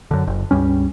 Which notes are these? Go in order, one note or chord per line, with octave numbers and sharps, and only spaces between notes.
F#2 D3
F#1
C#2 G2 G3 C#4